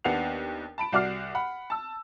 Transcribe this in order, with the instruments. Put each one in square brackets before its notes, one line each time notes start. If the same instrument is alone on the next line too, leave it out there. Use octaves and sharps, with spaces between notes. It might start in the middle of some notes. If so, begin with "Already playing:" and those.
[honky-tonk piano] D#2 B3 D4 F#5 C7 F7
A5 B5 D7
C2 F#4 D5 D6 F6 C7
F#5 B5
A5 E6